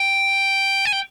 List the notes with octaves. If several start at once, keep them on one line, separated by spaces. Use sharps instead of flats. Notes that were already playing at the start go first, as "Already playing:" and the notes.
Already playing: G5
G#5
G5